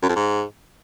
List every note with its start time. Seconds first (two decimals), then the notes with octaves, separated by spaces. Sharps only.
0.03 F#2
0.09 F2
0.16 G#2